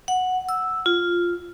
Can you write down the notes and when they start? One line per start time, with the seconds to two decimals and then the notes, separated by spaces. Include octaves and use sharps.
0.08 F#5
0.49 E6
0.86 F4